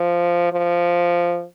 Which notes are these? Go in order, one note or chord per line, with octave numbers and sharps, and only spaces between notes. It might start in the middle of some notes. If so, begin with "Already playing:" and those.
Already playing: F3
F3